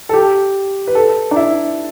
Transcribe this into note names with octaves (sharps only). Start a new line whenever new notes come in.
A4
G4
B4
A4
D4
E4